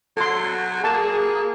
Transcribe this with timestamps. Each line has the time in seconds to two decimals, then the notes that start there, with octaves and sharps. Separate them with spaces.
0.17 F#3 A4 C6
0.84 A#3 G#4 A5